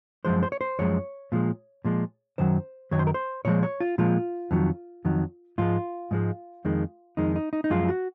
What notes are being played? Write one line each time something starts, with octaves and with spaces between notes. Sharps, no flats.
F#2 F3 G#3 C5
C5
C#5
C5
F#2 F3 G#3 C#5
A#2 F3 G#3
A#2 F3 G#3
F#2 D#3 F#3 C5
F#2 D#3 F#3 C#5
C5
A#4
C5
A#2 F3 G#3 C#5
C#5
F4
A#2 F3 G#3 F4
F2 D#3 F#3
F2 D#3 F#3
G#2 F3 G#3 F4
G#2 F3 G#3
F2 D#3 G#3
F2 D#3 G#3 D#4
D#4
D#4
D#4
F#2 F3 G#3 F4
F#4